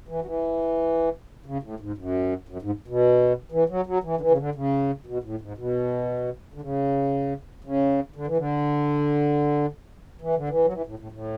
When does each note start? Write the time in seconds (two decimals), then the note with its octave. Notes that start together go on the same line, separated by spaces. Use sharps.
0.08 E3
0.22 F#3
0.25 E3
1.46 C#3
1.63 A2
1.80 G#2
1.98 F#2
2.49 F#2
2.62 G#2
2.88 B2
3.52 E3
3.69 F#3
3.86 F#3
4.04 E3
4.17 D3
4.21 E3
4.31 C#3
4.38 D3
4.55 C#3
5.06 B2
5.24 A2
5.41 G#2
5.58 B2
6.54 D3
6.61 C#3
7.64 C#3
8.16 D3
8.27 E3
8.37 D3
10.21 E3
10.35 D3
10.49 E3
10.65 F#3
10.73 E3
10.86 A2
10.99 A2
11.12 A2